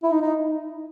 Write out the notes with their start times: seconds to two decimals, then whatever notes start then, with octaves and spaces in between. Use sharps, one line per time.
0.03 E4
0.11 D#4
0.22 D#4